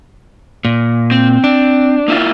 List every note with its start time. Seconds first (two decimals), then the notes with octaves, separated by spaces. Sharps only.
0.65 A#2
1.11 C4
1.44 D4
2.08 A#3 E4 F4